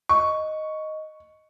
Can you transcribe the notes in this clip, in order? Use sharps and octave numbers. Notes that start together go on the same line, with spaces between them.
D#5 C#6